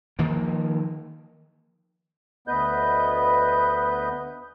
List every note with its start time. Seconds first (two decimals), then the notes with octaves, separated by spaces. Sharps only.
0.19 D#3 F3 A#3
2.48 D2 B3 B4 D#5 G6